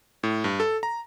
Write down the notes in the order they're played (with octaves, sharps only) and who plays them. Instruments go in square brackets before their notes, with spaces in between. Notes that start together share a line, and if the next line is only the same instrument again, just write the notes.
[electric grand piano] A2
G2
A4
A#5